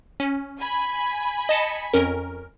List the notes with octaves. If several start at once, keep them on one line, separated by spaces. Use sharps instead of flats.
C#4
G#5 B5
D#5 A5 C#7
F2 C#4 A#4